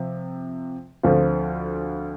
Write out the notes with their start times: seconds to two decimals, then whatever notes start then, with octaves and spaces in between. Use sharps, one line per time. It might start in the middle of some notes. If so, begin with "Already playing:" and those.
Already playing: C3 F3
1.03 D2 D3 F3 C4 F4